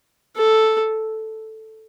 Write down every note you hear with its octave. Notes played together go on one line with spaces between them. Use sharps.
A4